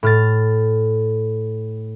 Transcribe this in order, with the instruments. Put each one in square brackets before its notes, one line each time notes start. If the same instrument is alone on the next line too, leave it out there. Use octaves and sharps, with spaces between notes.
[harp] A2 F6 A6